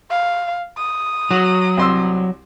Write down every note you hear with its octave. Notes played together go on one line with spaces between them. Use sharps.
F5
D#6
F#3 F#4
C2 C6 E6